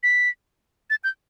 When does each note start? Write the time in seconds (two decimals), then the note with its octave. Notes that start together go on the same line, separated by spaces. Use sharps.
0.03 B6
0.90 A6
1.04 G6